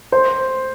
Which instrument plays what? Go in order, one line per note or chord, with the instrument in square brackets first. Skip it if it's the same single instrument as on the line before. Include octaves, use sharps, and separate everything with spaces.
[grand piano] C5